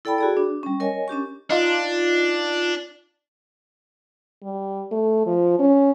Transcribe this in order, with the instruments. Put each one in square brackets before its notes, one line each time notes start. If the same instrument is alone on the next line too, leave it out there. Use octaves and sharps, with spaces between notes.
[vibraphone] E4 A4 D5 G5 A5 B5
F#4 G#4 D5
D4
G3 C#4
A#4 C#5 D#5 G#5
C#4 D4 G4 C#6
[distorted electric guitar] D4 [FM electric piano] D#4 F4
[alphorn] G3
A3
F3
C#4